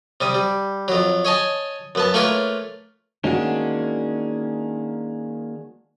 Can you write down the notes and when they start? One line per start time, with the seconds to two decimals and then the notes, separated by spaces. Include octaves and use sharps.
0.21 C3 G3 D#6
0.34 G3
0.88 F2 F#3
1.25 C#5 D#5 G#5 A5
1.95 F#2 B3 A5
2.14 A3 A#3 F4 A#4 B4 C#5
3.24 D#3 G#3 A#3 C#4 D4 F#4